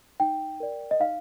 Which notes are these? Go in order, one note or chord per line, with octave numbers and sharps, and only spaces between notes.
D#4 G5
A#4 D5
D#5
D#4 F5